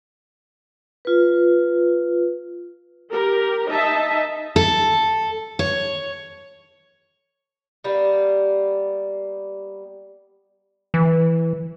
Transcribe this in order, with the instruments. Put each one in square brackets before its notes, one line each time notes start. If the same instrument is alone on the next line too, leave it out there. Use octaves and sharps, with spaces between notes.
[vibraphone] F4 B4
[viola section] G4 A#4
D#4 D#5 E5 A5
[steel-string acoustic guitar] A4
C#5
[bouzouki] G3 A#3 B3
[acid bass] E3